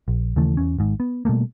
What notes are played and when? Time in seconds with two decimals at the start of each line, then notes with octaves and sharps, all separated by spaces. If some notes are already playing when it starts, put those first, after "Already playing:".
0.08 A#1
0.36 D#2 C#3 E3 A3
0.57 E2 C#4
0.79 G#1 G#2
1.00 B3
1.25 B2 G3 A3 A#3